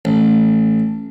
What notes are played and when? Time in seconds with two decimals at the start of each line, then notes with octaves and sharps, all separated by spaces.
0.05 A1